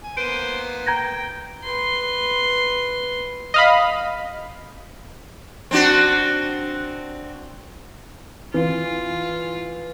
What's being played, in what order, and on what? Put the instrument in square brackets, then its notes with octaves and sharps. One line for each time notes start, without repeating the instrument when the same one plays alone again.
[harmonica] G#5
[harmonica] A#3 B3 [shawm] C5 [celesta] D7 D#7
[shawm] G5 [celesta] A#5 G#6 A#6
[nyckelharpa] B4 C6
[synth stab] D#5 F5 B5
[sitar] C4 D4 F#4
[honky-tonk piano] E3 [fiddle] F4